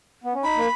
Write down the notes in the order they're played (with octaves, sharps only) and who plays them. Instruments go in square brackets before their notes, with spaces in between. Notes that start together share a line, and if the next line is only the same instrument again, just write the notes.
[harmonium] B3
C#4
[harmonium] D#4 [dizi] B5
[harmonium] A#3